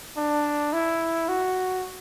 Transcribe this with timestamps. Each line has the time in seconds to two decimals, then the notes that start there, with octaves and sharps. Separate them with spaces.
0.17 D4
0.73 E4
1.29 F#4